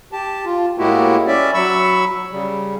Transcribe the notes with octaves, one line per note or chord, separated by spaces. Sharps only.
G4 A5
F4
A2 G#3 A#3 E4 F#4 G4
C#4 D5 E5
F#3 B5 C#6 E6
C#3 G3